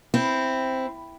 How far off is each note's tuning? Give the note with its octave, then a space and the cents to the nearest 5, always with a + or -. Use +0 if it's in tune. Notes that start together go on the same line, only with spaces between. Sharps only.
C4 +0 E4 +0